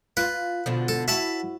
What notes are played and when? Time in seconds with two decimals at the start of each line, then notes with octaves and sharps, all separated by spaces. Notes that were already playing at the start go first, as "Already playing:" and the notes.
0.17 F4 B4
0.66 B2 D3 F3
0.88 A4
1.08 E4 F#4 E5 A5 B5